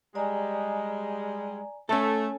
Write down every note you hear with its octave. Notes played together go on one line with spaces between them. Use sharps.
G3 G#3 D5 G#5 A#5
A3 C#4 A4